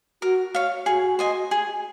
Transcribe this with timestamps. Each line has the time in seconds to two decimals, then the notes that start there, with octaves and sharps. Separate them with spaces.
0.22 F#4 A#4
0.55 C#5 F5
0.86 F#4 G#4
1.19 C5 D#5 G#5
1.51 G#4